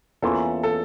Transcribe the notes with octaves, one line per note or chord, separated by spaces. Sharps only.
E2 E3 A#3 C#4 F4 A4
A4